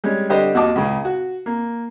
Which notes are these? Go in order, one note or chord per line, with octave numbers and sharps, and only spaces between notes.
G3 G#3 C#4
D3 G3 D4 G4 C5 D#5
D#2 F#4 D#5 A5 D6
C#2 C#3
F#4
A#3